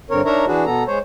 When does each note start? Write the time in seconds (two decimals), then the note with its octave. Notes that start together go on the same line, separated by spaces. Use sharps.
0.10 G2 D3 C4 A#4 C#5
0.25 D4 D#4 A#4 C#5 E5 A#5
0.47 E3 D4 F#4 G#4 B4
0.65 B2 B3 A4 A#5
0.87 G#3 C5 C#5